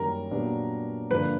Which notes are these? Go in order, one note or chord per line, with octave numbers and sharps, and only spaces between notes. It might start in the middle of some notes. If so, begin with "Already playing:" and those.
Already playing: F#2 D#3 G3 A#3 A#4
A#2 F#3 B3 D4 G4
G2 D3 F3 A#3 D4 B4